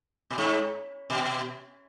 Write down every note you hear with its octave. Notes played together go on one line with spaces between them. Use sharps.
B2
G#2
B2